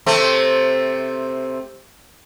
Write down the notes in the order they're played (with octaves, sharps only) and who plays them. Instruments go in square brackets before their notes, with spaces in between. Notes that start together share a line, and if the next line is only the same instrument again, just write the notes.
[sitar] C3 A3 C4